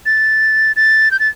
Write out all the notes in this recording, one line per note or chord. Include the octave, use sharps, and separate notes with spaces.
A6
A6
G6
A6